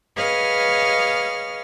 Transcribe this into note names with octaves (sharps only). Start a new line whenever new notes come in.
G#4 B4 C#5 D#5 F5 F6